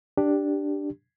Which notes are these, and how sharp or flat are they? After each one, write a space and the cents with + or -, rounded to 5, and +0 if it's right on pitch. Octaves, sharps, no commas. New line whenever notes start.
D4 +0 G4 +0